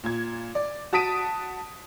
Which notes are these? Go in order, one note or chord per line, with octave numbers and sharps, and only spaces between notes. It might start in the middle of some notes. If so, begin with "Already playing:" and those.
A#2 G#6
D5
F#4 A5 D#6 B6 D7 D#7